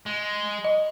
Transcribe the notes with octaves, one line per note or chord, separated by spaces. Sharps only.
G#3
D#5